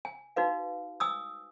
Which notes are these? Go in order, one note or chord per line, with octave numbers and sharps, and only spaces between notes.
G#5
D#4 F#4 B4 F5
G#5 D#6 E6